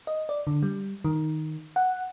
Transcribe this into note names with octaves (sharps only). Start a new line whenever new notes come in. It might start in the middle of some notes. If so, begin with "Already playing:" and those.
D#5
D5
D3
G3
D#3
F#5